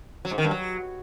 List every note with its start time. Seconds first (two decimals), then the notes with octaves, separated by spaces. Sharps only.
0.25 F#3
0.31 G#2
0.38 D#3
0.44 G2
0.51 F#3